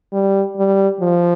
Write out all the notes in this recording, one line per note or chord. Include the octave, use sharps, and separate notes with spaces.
G3
G3
F3